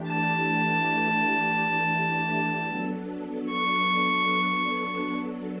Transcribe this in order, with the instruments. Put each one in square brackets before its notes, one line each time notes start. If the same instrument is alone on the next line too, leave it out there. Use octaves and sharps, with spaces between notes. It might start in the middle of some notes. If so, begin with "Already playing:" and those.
Already playing: [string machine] E3 A3 D4 G4
[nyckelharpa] A5
[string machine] F#3 B3 D4 A4
[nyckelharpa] C#6